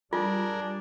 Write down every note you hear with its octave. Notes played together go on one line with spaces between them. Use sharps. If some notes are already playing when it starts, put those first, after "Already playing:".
G3 D4 F4 G#4 A#4